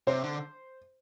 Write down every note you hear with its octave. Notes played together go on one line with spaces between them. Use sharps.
C3 C5
D3